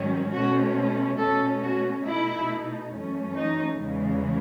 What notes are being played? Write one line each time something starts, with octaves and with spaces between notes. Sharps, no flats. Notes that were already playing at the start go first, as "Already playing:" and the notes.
Already playing: G#2 D#3 F#3 C#4
B2 A3 C#4 F#4
B2 A3 C#4 A4
F#4
B2 A3 D#4 E4
F#2 E3 A3 C#4
D#4
E2 C#3 E3 G#3